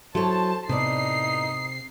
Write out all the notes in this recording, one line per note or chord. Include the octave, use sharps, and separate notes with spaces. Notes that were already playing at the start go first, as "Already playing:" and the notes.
F#3 E4 A4 C5 C#5 A5
A2 C3 B3 D#4 D5 C7